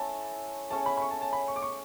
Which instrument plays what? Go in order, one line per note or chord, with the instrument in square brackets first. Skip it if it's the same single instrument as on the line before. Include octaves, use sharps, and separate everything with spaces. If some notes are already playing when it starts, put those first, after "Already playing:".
Already playing: [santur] A3 C#4 E4 [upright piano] A5
[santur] A3 C#4 G#4 C#5 [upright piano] A5
[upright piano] B5
B5
C#6
A5
A5
B5
C#6
D6
C#6